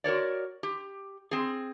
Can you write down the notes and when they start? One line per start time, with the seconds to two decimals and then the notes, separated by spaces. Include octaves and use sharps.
0.04 F#4 A#4 C#5 D5
0.63 G4
1.31 C4 G#4